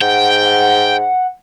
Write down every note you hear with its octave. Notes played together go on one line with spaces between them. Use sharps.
G#2 F#5 G5
F#5